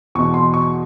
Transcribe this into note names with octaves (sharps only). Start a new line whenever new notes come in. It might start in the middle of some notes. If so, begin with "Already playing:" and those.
E2 B2 C#6
C6
C#6